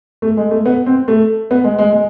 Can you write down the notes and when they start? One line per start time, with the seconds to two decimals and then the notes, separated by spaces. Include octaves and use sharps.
0.22 A3
0.37 G#3
0.51 A3
0.65 B3
0.86 C4
1.08 A3
1.51 B3
1.64 G#3
1.78 G#3
1.92 G#3